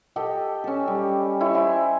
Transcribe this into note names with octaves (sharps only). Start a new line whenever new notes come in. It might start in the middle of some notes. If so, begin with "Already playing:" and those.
G4 A4 D#5
C#4 A4
G3
E4 C#5 D#5
C5 G#5